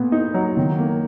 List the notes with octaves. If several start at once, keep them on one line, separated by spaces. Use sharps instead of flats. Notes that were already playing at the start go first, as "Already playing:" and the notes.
Already playing: A#2 B3
D#4
F#3
D#3
A#3